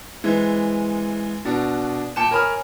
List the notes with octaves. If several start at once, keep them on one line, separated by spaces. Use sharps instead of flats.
E3 G#3 C4
B2 D4 F#4
A#2 G5 A5 D6 C#7 E7
A#4 C#5 G#5 B5 D#6 F6